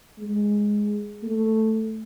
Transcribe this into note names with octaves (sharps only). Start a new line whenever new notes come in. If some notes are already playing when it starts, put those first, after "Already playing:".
G#3
A3